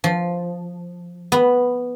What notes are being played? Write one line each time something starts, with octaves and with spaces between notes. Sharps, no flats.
F3
B3